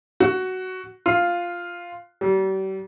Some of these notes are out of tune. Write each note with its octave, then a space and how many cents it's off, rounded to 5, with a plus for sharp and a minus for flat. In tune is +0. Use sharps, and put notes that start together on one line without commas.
F#4 +10
F4 +0
G3 -40